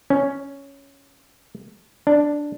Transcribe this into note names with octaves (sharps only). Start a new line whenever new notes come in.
C#4
D4